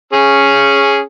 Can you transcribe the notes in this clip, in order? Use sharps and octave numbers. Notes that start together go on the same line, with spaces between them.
C#4 G#4